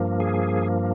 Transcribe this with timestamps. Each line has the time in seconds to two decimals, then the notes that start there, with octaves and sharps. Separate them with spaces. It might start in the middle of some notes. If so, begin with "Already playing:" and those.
Already playing: G2 F3 A#3
0.20 G#4